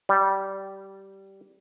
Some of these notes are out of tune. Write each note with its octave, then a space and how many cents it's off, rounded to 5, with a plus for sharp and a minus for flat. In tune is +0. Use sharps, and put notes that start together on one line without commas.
G3 -15